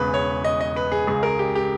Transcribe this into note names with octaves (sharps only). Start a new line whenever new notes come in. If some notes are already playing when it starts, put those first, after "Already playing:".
Already playing: E1 E2 C#3 B4
C#5
D#5
D#5
B4
G#4
C#2 C#3 G#3 G#4
A#4
G4
G4